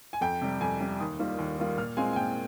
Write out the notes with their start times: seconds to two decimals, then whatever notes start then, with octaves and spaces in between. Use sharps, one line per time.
0.13 G#5
0.21 F2 G5
0.41 C3 G3
0.60 F2 G#5
0.81 C3 G3
1.00 D#2 D#6
1.19 D#3 G3 A#3 F4
1.39 D#2
1.58 D#3 G3 A#3 F4
1.78 A#2 F6
1.97 G#3 C4 F4 G#5
2.13 G#5
2.16 A#2 G5